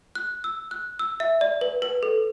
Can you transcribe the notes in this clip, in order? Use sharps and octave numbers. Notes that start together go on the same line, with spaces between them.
F#6
E6
F#6
E6
E5
D5
B4
B4
A4